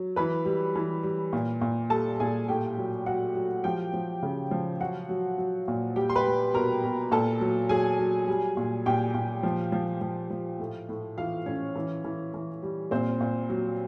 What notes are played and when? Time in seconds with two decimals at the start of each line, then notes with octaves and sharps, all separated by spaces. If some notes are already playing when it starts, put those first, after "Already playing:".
Already playing: F#3
0.16 E3 B4 B5
0.45 G3
0.75 E3
1.03 G3
1.33 A#2
1.61 A#2
1.90 G3 A4 A5
2.20 A#2 G#4 G#5
2.48 A2 G4 G5
2.77 F#3
3.06 F#3 F#4 F#5
3.35 F#3
3.64 F3 G4 G5
3.93 F3
4.23 C#3
4.51 F3
4.80 F#3 F#4 F#5
5.09 F#3
5.38 F#3
5.68 A#2
5.96 G3 G4 G5
6.10 C6
6.15 B4 B5
6.26 G3
6.54 B2 A#4 A#5
6.84 B2
7.11 A#2 A4 A5
7.41 F#3
7.69 F#3 G#4 G#5
7.99 F#3
8.27 G3
8.57 A#2
8.86 A#2 G4 G5
9.14 A#2
9.43 F3
9.72 F3
10.01 F3
10.30 F3
10.59 A2
10.89 A2
11.18 E3 F4 F5
11.46 A2 C#4 C#5
11.76 E3
12.04 E3
12.34 E3
12.63 G3
12.91 A#2 C4 C5
13.21 A#2
13.50 F#3